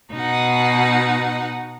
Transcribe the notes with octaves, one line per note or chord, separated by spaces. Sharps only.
B2 D#4 F#5